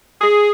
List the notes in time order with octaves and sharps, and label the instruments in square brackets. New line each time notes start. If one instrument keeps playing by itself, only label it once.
[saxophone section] G#4